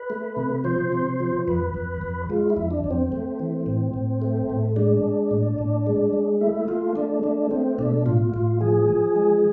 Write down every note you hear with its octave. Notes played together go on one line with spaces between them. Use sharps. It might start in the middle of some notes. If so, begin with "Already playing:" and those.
Already playing: B4
A3
C3
F3 C5
C3
F3
F2 B4
F2
F2
G#3 F4
E4
F2
D4
F2
C4
A3
E3
A2
A2
A3
A2
G#3 D4
G#3
A2
A2
G#3
G#3
A3 E4
A3 F4
A3 D4
A3 D4
A3 C4
B2 D4
A2 F4
A2 F4
F3 G#4
F3
G#3